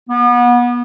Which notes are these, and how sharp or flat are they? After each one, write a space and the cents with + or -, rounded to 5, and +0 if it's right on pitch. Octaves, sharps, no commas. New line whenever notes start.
B3 -30